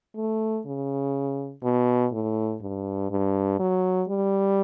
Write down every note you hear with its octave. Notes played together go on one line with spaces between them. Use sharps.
A3
C#3
B2
A2
G2
G2
F#3
G3